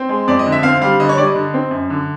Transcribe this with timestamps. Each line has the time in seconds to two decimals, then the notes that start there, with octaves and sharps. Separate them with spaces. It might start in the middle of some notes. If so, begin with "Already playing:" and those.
Already playing: C4
0.09 G#3
0.27 F2 D5
0.39 D#5
0.46 D3
0.52 E5
0.63 C4 F5
0.82 G3 F5
1.00 D3 D#5
1.09 C#5
1.18 G3 D5
1.27 D#5
1.35 D3
1.54 C4
1.71 F#2
1.90 D3